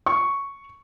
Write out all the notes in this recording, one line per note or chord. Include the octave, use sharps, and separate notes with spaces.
C#6